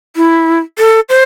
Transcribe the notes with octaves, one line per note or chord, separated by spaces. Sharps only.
E4
A4
C5